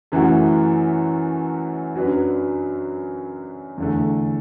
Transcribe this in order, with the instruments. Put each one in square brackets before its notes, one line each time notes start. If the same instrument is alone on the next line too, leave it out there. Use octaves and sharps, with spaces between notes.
[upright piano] F#2 E3 A3 F#4
F#2 F#3 D4 B4
E2 D3 A3